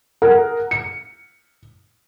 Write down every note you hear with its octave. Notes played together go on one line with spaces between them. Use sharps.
G#4 A#4 F#5
C#7